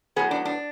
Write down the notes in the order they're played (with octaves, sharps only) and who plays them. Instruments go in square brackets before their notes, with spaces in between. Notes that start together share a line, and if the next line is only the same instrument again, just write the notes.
[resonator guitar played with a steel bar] A2 F#3 B3 G#4
D4
D4